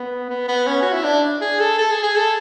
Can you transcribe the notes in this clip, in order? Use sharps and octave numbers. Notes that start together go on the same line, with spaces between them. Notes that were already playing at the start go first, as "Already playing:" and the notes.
Already playing: B3
B3
B3
C#4
F#4
E4
D4
G#4
A4
A4
G#4
G#4
A4